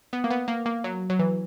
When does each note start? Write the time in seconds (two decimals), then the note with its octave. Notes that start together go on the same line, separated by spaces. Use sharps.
0.13 B3
0.24 A#3
0.31 B3
0.48 A#3
0.66 A#3
0.84 F#3
1.10 F#3
1.19 E3